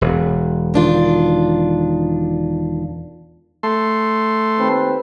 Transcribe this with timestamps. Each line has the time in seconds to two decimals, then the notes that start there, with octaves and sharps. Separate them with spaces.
0.01 E1
0.74 D#3 D4 F4
3.63 A3 C6
4.57 D#2 C4 B4